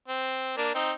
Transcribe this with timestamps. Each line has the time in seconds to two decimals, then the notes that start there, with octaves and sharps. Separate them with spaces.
0.08 C4
0.57 A#3 D4
0.74 C4 D#4